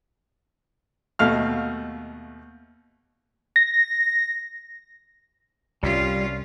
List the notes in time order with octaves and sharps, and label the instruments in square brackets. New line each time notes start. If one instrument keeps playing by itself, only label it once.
[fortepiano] D#2 B2 A3 F5 F6
[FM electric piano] A#6
[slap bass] C2 [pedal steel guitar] G3 [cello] C#4 F4